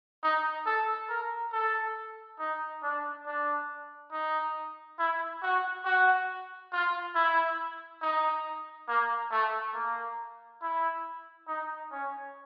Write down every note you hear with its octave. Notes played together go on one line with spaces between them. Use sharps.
D#4
A4
A#4
A4
D#4
D4
D4
D#4
E4
F#4
F#4
F4
E4
D#4
A#3
A3
A#3
E4
D#4
C#4